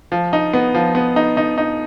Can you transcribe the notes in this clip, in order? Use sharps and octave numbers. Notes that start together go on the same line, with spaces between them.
F3
D#4
B3
F3
B3
D#4
D#4
D#4